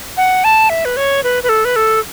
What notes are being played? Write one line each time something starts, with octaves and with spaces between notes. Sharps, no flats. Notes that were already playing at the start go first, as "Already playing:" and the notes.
F#5
A5
E5
B4
C#5
B4
B4
A4
B4
A4